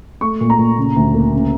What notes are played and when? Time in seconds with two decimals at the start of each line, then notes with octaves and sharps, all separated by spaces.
0.21 A3 C#6
0.41 A#2
0.50 A#5
0.59 A#2
0.78 C#3
0.96 D2
1.14 A#3
1.33 C#3